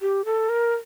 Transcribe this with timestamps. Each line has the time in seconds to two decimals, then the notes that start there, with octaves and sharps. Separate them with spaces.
0.01 G4
0.25 A4
0.49 A#4